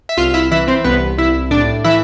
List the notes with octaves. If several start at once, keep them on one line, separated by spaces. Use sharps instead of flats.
E5
C2 F4 F5
E4 E5
E3 E4 E5
C4 C5
C2 B3 B4
C2 E4 E5
A2 D4 D5
E3 E4 E5